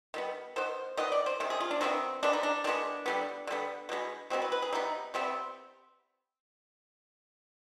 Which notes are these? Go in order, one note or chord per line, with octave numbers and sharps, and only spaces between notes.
D#3 G3 B3
D#3 B3 C5
D#3 B3 D#5
D5
C5
C3 D#3
G#4
F4
D4
C3 D#3 G#3 B3 C4
D#3 G#3 B3 D4
D#4
D4
D#3 G#3 B3 D4
D3 G3 B3
D3 G3 B3
B2 G#3 B3
B2 G#3 B3 C4
B4
B4
G#4
C3 G3 B3 D#4
C3 G3 B3 C4